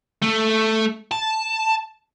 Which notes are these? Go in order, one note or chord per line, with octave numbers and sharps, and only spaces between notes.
A3
A5